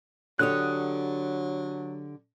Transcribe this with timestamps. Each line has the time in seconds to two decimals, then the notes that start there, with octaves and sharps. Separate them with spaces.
0.39 D3 F#3 G4 C#5 D#6 F#6